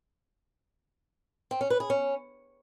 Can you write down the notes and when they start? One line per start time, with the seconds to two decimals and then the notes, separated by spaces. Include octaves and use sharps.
1.51 C4
1.61 C#4
1.70 B4
1.80 G#4
1.90 C#4